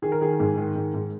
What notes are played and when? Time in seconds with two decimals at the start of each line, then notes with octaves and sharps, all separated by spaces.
0.02 D#3 G#4
0.12 A#4
0.21 D#3 G#4
0.40 G#2
0.57 D#3
0.76 G#2
0.94 G#2